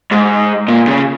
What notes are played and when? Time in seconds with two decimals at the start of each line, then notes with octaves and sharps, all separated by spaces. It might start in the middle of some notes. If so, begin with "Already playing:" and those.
0.11 G#2
0.68 A#2
0.88 C#3